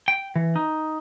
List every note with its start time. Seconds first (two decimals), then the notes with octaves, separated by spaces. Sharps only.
0.08 G5
0.36 E3
0.56 D#4